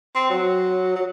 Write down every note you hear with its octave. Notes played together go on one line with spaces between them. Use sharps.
C4
F#3
F#3